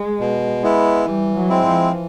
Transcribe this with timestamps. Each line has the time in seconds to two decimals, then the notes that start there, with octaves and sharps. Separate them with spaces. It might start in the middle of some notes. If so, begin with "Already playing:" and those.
Already playing: G#3
0.20 B2
0.62 G#3 B3 E4
1.06 E3 G3
1.35 F#3
1.49 G#3 C4 E4
1.63 F3
1.92 E3